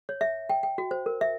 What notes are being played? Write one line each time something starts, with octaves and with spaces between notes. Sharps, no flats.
C#5
E5
G5
G5
F#4
C5
A#4
E5